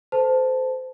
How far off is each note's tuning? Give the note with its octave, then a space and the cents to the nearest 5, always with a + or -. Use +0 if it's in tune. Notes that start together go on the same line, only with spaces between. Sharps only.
A4 +0 C5 -25 A5 +0